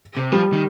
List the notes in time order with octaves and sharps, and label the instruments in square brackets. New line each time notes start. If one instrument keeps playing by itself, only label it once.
[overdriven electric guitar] C3
[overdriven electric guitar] F3 [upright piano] G3
[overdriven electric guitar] D#3